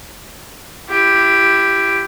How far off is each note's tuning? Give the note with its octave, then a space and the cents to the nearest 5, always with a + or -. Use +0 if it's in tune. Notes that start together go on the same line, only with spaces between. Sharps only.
E4 +30 G4 +0